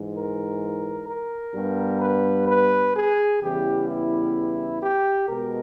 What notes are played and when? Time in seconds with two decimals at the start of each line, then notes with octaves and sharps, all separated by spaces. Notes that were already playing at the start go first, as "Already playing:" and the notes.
Already playing: G#2 E3 G#3
0.15 A#4
1.08 A#4
1.55 G2 G3 B3
2.02 B4
2.48 B4
2.95 G#4
3.41 E2 C#3 E3 G3 B3 G4
3.89 E4
4.82 G4
5.29 B2 G#3 A#4